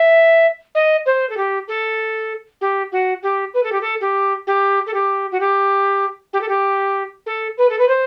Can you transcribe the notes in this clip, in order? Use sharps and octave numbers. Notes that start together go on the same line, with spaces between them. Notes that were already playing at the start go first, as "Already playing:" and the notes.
Already playing: E5
D#5
C5
A4
G4
A4
G4
F#4
G4
B4
A4
G4
A4
G4
G4
A4
G4
F#4
G4
G4
A4
G4
A4
B4
A4
B4
C5